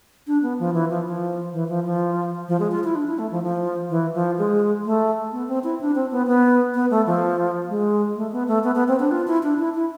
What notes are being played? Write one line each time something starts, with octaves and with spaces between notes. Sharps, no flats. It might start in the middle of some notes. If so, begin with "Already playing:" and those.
D4
B3
F3
E3
F3
F3
E3
F3
F3
F3
G#3
F4
E4
D4
E4
A3
F3
F3
E3
F3
G#3
A3
B3
C4
E4
D4
C4
B3
B3
B3
A3
F3
G#3
A3
B3
A3
B3
B3
C4
D4
F4
E4
D4
E4
E4